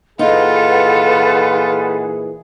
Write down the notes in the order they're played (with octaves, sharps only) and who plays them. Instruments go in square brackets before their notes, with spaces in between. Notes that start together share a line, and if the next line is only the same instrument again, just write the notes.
[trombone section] A#2 E3 G#4 [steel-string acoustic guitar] D#4 [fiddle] F4 [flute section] A4 B4 F#5